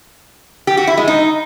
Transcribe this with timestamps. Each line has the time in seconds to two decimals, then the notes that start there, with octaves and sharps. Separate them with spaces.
0.67 G4
0.77 F#4
0.87 E4
0.97 G#3
1.08 D#4